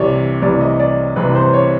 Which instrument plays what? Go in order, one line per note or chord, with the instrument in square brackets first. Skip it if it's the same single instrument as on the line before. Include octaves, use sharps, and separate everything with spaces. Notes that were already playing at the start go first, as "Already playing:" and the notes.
Already playing: [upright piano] C2 C3 E3 C#5 D5
C2 C3 E3 D5
D#5
D5
C2 C3 E3 B4
C5
C#5